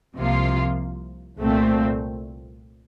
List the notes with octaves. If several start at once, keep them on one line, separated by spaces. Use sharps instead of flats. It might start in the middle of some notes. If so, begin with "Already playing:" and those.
C2 C3 F3 A#3 F4
C2 A#2 A3 C4